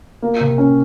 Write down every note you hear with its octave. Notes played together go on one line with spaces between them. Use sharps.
A#3
C3
C#4